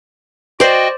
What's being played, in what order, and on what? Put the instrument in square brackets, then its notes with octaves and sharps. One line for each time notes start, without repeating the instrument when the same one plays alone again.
[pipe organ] F#4 D#5 G5 [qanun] C5 D5